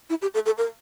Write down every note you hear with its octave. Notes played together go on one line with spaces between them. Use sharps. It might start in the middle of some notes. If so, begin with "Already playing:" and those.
E4
G4
A4
A4
A#4